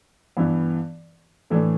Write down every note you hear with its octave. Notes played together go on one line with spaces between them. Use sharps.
G2 E3 B3
A2 E3 A3 D4